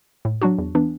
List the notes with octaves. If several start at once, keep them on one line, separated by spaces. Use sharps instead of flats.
A2
F#3 D4 F#4
E2
E3 B3 D4